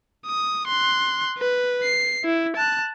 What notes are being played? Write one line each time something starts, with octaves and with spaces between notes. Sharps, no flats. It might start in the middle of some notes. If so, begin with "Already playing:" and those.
D#6
C6 F#6
B4
C7
E4
A5 F#6